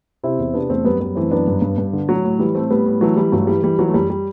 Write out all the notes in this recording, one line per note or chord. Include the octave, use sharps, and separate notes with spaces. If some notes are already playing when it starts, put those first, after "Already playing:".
C3 C4 E4
E2
C3 B3 D4
E2 A3 C4
F#2 G3 B3
F#2 G3 B3
E3 A3 C4
F#2 B3 D4
G2
G2
G2
D3
A2 F#3
A2
E3 G3
A2 A3 C4
A2 G3 B3
A2
E3 F#3 A3
E3 G3
G2 F#3 A3
E3 G3
E3 G3
E3 F#3
A3
F#2 G3
G3